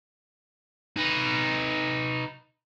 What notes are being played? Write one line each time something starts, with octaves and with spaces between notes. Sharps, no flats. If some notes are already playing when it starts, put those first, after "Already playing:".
D#4 B4